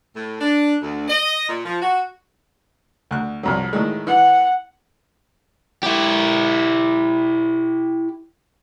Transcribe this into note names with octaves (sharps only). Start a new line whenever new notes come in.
A2
D4
D2
D#5
A#2
F3
F#4
D2 F#6
C2 F2 F#3
A2 D#3 G#3
E3 F#5
E4 G4